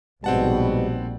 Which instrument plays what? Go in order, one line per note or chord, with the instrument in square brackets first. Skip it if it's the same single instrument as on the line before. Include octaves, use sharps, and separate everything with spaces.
[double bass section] A#1 [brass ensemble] G#2 B2 [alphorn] G3 [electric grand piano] C4 F#5 A5